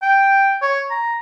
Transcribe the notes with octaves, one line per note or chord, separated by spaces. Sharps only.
G5
C#5
A#5